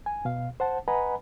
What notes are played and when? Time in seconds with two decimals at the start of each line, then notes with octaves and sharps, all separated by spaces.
0.06 G#5
0.25 B2 F5
0.60 C5 F#5 A5
0.88 B4 D#5 F#5 G#5 A#5 B5